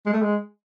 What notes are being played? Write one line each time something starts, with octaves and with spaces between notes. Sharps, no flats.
G#3
A3
G#3